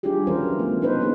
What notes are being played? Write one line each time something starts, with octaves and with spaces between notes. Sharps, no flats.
G3 D4 E4 F4 G4 G#4
E3 F#3 C#4 A#4 C5
F3 A3 B3
C#4 D#4 B4 C5
F#3 A#3 B3 D4 D#4 G#4